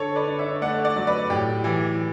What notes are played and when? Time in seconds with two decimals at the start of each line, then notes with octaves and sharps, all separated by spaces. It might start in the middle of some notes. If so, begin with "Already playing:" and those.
Already playing: D3 A4 C#5
0.15 B4 D5
0.27 D3
0.39 C#5 E5
0.61 A3 D5 F#5
0.84 D5 F#5
0.96 F#3
1.07 B4 D5
1.30 A2 G4
1.64 E3